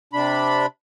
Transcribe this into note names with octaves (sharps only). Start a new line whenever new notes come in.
C3 D4 B5